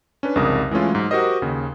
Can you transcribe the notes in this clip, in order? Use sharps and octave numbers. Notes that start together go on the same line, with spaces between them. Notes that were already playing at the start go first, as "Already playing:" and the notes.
C#4 D4 B4
C2 F2 G#2 C#3 A#4 D#6
E3 G#3 A3 C#4 F4
G#2 F#3
F#4 G4 A#4 C5 D#5
D#2 C#3